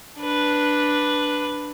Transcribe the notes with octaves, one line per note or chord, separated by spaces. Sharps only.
D4 B4